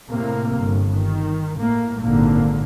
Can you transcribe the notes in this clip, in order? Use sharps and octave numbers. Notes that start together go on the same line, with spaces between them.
A2 C3 A#3
G1
D#3
A2 A#3
G#1 A#2 D3 A#3